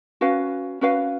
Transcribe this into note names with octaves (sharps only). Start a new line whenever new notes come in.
C#4 F#4 B4 F5
C#4 F#4 B4 F5